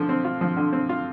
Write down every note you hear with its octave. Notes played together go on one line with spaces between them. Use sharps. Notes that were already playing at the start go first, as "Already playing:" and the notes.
Already playing: D3 F3
C4
F4
F3
D3
C4
F4